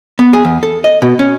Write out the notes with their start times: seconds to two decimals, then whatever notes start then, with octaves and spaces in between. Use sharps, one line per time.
0.19 B3
0.33 G#4
0.45 E2
0.63 A4
0.84 D#5
1.02 B2
1.19 C#4